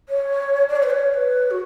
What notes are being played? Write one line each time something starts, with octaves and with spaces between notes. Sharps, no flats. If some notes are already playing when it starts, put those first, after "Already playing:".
C#5
D5
C#5
B4
C#5
B4
F#4